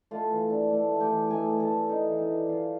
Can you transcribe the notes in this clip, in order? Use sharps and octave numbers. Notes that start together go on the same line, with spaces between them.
A3 F4 F5
E3
D4
A3
A3
G4 G5
E3
A3 G#4 G#5
A3
A4 A5
E3
E3 D#4 D#5
E3
D#4 D#5
D4
F#3 F4 F5